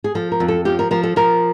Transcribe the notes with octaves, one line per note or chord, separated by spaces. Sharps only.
G#4
F3 A4
A#4
F2
A4
F3 G4
A#4
F3 A#4
A4
F3 A#4